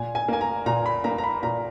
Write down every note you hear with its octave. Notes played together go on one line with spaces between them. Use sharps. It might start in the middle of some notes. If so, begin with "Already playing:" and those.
Already playing: A#2 G#5
G#5
A#3 G#5
A#5
A#2 A#5
B5
A#3 A#5
A#5
B5
A#2 A#5